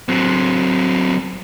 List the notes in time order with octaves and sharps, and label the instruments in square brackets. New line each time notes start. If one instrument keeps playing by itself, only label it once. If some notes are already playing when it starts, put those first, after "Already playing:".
[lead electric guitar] F#3 C4